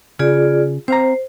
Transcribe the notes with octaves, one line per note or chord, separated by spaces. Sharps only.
C#3 F4 G#4 D5
C4 C5 F5 A#5